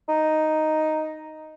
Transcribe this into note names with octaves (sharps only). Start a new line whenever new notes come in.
D#4